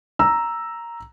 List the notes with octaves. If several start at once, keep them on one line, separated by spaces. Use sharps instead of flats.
A#5 E6